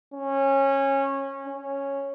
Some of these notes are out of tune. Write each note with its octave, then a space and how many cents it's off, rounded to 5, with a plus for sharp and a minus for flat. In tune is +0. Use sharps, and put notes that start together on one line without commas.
C#4 -20
C#4 -5